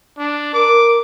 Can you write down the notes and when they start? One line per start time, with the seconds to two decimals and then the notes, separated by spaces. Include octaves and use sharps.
0.18 D4
0.54 A#4 D6